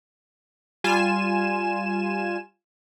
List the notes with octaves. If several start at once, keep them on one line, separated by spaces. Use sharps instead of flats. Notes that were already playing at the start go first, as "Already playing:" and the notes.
G3 F4 G#5 E7